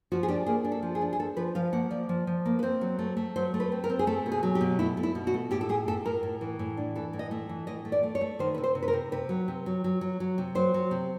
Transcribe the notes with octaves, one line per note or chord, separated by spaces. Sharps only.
F3 F#4
G#4
D4 G4
A#3 G#4
D4
A4
F3
G#4
D4
G#4
D4 A4
F3 B4
F3 F5
A#3 F#5
F3 D5
F3
F3
A#3
B4
C4 C5
F#3
A3
A3
F#3 C5
A3
B4
C4
A#4
C4
G#4
A3 A4
B2
G#4
F#3
G4
B2
A3 E4
A3
E4
B2
F#4
A3
A2 G4
A4
A3 G#4
A2 A4
A2 A#4
A2
E3
A2
D4
E3 A4
A2
D#5
A3
E3
A2 D#5
A3
D5
A3
C#5
A3
D#3 C5
C3 B4
C5
C3
B4
A#4
C3
C3 B4
F#3
C3
F#3
F#3
F#3
F#3
C3
F#3 C5
F#3
C3